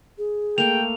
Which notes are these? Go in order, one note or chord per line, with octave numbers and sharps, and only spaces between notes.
G#4
A3 A#3 G5 F7